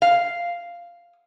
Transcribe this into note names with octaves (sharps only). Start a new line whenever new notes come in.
F5